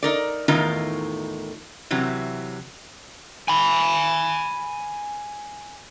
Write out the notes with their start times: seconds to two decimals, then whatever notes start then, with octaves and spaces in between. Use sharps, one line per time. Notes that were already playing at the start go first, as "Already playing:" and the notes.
0.03 D#4 A#4 D5
0.48 E2 A2 D#3 D#4 F4 A#4
1.91 C3 E3 F#3
3.48 G#5 B5